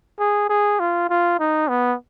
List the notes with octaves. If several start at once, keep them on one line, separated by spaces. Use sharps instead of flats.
G#4
G#4
F4
F4
D#4
B3